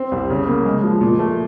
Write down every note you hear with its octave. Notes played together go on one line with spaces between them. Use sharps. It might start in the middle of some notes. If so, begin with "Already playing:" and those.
Already playing: C4
C2
C#3
A#3
G#3
F3
A#2
A3